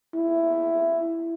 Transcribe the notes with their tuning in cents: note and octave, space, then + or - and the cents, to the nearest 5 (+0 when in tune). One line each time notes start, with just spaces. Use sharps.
E4 +10